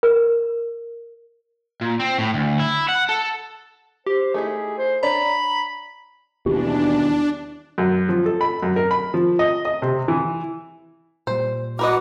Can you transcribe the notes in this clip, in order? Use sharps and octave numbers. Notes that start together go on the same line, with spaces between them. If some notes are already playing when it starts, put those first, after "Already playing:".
A#4
A#2
C4
A2
D2
E4
F#5
A4
G4 C5
A3 D#4 E4 G#4
C5
D4 C#5 D5 A#5 B5
D#2 B2 E3 D4 G4
F#2
F3
A4
B5
F#2
A#4
B5
F3
D#5
D#5
C3
E3
A#2 G3 C5
F#4 A#4 B4 D#5 D6